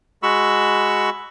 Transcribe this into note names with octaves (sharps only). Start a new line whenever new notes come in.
G#3 F#4 B5 C#6 E6